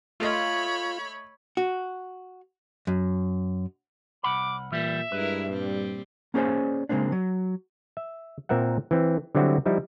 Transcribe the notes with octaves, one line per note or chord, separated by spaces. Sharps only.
A3 F4 C#5 D#5 B5
F#4
F#2
C2 F#5 B5 D6
A#2 E3 G3 E5
G2 G#3 E4 A#4 B4
A#2 G3 C4
A#3 C#4 G#4 C5 D5 G#5
C#3 G#3 A#3 C4 D4
F#3
E5
A#2 C4 A#4 E5 F#5
E3 C4
D3 F#3 G3 C4 E4 F#4
F3 G3 D#4 E4